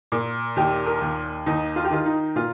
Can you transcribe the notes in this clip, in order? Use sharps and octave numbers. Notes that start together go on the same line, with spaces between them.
A#2
D#2 G4
A#4
D#2
D#2 D#4
F4
G4
D#3 F4
D#4
A#2 F4